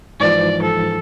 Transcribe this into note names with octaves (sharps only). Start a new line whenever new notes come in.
G#2 E3 F3 D5
A4